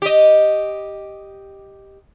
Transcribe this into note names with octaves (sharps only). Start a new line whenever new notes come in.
G4 D#5